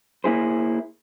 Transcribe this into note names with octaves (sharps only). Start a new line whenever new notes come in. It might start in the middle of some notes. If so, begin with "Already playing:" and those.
A#3 E4 G#4 C5